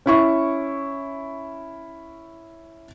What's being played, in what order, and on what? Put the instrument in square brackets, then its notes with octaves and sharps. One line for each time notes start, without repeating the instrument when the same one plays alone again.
[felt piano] C#4 E4 C#6